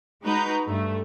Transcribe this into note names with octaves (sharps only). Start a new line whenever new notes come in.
G#3 D#4 F#4 B4 A#5 G6
G2 A3